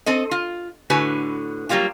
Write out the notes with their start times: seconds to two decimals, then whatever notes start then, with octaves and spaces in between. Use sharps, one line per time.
0.06 C4 A4 D#5
0.31 F4
0.90 A2 D3 F#4 B4 G#5
1.69 F#3 G3 A#3 F4 G4